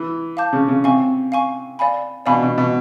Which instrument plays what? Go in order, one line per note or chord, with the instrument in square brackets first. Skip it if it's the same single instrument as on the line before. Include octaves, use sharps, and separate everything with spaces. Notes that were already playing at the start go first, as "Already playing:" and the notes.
Already playing: [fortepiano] E3
[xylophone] F5 A5 D6 G6
[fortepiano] C#3
C#3
[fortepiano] C3 [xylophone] F5 G#5 C#6
[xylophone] F5 G#5 C#6
D5 F5 G#5 B5
[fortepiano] B2 [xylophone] D5 F5 G#5 B5
[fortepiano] B2
B2